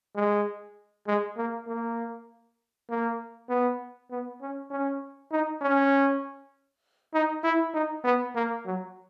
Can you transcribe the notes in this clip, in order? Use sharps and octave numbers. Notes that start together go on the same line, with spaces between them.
G#3
G#3
A#3
A#3
A#3
B3
B3
C#4
C#4
D#4
C#4
D#4
E4
D#4
B3
A#3
F#3